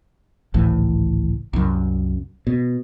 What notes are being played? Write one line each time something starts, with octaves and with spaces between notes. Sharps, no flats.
G#1 C#2 A2 E3
C2 F#2
B2